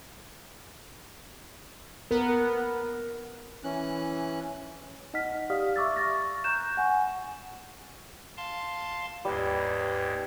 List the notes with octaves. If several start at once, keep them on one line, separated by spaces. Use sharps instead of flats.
B3 A#4
E3 C#4 F#6
D#4 D#5 F#5 F6 B6
G4 D5 F5 D#6 F6
E5 C#6 D6 E6 A6
C#6 F6 A6 A#6
A#5 C#6 F#6 G6 E7
F#5 G#5 B5 C#6
F5 A5 C6
D#2 G#2 G3 B4